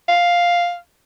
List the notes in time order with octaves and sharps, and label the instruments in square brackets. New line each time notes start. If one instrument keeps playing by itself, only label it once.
[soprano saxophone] F5